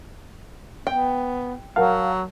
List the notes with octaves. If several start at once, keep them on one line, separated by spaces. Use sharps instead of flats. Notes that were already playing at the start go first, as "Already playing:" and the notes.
B3 G5
F#3 A#4 F5 F#5 A5